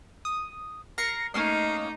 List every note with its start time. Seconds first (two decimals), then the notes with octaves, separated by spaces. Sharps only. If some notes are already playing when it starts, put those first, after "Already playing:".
0.25 D#6
0.98 A#4 A#6 C7 C#7
1.34 A3 A#3 C#4 D#4 D#5 C7